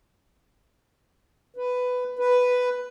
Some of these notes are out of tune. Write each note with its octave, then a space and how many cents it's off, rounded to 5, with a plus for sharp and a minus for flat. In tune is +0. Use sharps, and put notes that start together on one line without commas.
B4 +10
B4 +5